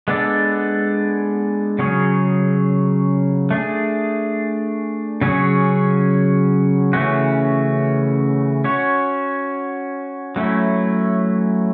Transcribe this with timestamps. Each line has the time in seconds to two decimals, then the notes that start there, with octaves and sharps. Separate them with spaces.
0.08 G#3 B3 D4 A4 D5
1.79 C#3 F#3 C#4 G#4
3.51 A3 D4 G#4
5.21 C#3 F#3 C#4 G#4 C#5
6.93 C#3 E3 A3 C#4 F#4
8.64 C#4 F#4 C#5
10.36 F#3 A3 C#4 E4